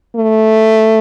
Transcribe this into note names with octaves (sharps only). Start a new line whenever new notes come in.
A3